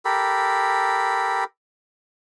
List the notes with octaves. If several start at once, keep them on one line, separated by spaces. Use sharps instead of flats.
G4 A4 A#4 B5